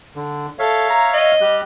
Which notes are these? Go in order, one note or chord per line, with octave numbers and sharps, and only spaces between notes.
D3
A4 C#5 E5 F5
A#5
D#5
G3 G4 F#6